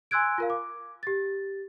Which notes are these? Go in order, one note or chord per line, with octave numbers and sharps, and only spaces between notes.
G#5 C6 E6 F#6 G#6 D7
F4 A#4 F5
D6
G4 A6